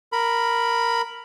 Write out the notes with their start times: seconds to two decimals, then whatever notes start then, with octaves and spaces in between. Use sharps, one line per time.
0.12 A#4 B5